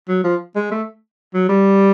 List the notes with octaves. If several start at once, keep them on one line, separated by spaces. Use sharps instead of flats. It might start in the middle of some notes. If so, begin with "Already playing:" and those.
F#3
F3
G#3
A3
F#3
G3